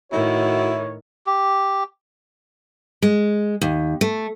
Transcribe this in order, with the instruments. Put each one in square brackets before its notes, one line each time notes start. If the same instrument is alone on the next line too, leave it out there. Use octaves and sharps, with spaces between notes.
[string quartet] A2 D#3 [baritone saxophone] E4 [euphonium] F#4 [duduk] C#5
[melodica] G4
[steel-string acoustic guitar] G#3
D#2
A3